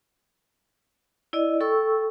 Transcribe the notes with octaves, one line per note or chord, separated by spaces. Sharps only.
E4 D5 D#5
A4 G5 C#6 E6